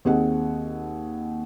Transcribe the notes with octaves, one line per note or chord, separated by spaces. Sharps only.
D#2 C4 G#4 D#5 F#5